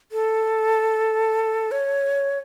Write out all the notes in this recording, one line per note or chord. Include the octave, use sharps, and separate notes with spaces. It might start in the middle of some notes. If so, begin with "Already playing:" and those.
A4
C#5